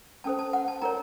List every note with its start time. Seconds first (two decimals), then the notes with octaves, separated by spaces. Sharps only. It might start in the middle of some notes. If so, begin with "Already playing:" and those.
0.24 C#4 A4 C5 A5
0.39 A5
0.53 F#5
0.68 A5
0.82 D#4 A#4 C#5 A#5